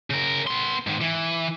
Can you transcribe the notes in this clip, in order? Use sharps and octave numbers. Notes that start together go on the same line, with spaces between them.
C#3 A#4
B3 C6
G#2 D#3
E3